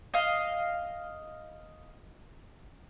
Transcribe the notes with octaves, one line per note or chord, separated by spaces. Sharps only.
D#5 F5